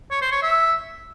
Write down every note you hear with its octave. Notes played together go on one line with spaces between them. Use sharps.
C#5
C5
C#5
E5